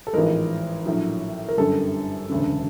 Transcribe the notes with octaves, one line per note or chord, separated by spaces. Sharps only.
A4
A1 G#2 F3 G#3 A#4
A#1 A2 F#3
A#4
G1 F#2 D3 G3 A4
E1 D2 C#3